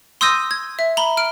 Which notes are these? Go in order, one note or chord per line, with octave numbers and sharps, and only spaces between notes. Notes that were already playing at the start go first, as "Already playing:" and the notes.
C6 D#6 E6 G6 A#6 D#7
G#6
E5
A#5 B5 F#7 G7
F6 D7